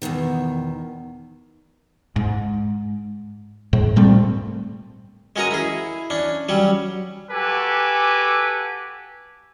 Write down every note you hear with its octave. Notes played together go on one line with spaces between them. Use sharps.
E2 G#2 B2 D#3
G#2
G#2
A#2 G3 A3 C4
G#3 C#4 F#4 A#4 A#5 D#6
E4 G#4
C#4 D4
F#3 G3 C#4
F#4 G4 A4 B4 G#5 D6